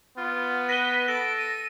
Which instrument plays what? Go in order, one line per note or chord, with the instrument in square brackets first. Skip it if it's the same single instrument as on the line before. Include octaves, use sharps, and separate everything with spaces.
[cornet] B3 [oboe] F4
[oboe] B4 [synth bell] A#6 D#7 G7 [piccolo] B6
[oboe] A4 [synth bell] A#6 [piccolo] D7
[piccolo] D#7